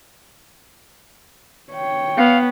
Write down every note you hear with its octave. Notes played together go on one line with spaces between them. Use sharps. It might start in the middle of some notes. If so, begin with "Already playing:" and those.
C#5 G5
B3 F5